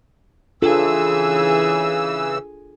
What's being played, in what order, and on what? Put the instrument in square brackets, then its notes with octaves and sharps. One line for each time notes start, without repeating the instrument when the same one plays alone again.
[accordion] C#3 E3 E6 [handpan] D4 F4 A4 [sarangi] G#4